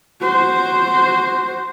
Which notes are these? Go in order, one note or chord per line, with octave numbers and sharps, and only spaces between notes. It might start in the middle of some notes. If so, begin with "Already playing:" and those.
F#4 C5